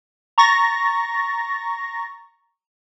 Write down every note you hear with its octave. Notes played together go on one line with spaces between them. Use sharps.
A#5 C#6 A6 A#6